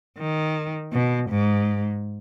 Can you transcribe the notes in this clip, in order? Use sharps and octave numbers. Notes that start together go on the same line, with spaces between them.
D#3
B2
G#2